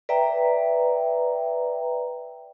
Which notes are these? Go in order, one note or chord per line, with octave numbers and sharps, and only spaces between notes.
B4 D5 E5 G5 A#5